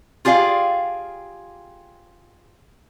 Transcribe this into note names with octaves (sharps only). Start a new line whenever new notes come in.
F4 G4 G#4 D5 F5